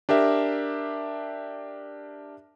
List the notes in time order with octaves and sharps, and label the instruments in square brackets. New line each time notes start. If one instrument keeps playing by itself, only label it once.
[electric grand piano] D4 G4 A#4 E5